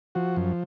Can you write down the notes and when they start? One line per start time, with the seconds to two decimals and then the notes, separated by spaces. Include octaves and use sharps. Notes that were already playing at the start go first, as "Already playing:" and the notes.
0.15 F3 F#4
0.36 F#2